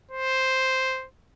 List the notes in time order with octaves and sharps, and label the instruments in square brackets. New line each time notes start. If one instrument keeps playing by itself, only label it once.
[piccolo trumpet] C5